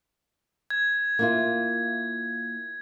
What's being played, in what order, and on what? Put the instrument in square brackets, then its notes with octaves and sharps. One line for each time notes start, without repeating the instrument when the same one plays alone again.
[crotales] G#6
[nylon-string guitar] A#3 E4 F4